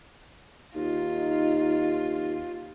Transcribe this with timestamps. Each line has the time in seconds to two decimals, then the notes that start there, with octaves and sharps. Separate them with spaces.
0.75 D#2 D#4 F4